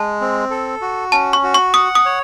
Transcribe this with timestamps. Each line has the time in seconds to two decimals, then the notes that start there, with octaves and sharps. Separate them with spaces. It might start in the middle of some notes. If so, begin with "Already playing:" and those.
Already playing: G#3 A5
0.21 C4
0.50 A4
0.82 F#4
1.12 C#4 A5
1.33 C#6
1.43 F#4
1.54 C#6
1.74 F#5 D#6
1.95 D#6
2.05 C#5